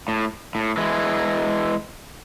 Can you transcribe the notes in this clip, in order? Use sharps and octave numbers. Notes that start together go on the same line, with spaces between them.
A2
A2
E3 G#3